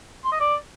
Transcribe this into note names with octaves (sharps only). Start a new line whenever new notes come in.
C6
D#5
D5